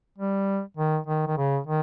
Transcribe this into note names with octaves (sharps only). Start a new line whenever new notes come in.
G3
D#3
D#3
D#3
C#3
D#3